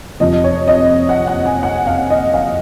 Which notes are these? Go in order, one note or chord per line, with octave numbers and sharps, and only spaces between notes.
F1 F2 C3 F3 D#5
C#5
D#5
F#5
F#5
G#5
F#5
F5
D#5
F5